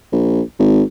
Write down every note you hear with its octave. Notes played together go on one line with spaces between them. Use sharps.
A#1
G#1